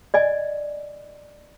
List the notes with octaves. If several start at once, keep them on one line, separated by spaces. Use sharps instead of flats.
D5 D#5 G#5